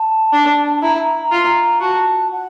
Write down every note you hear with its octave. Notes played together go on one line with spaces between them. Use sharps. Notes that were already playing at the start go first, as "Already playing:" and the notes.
Already playing: A5
D4
E4 A#5
A#5
A#5
F4
A#5
F#4 A5
F#5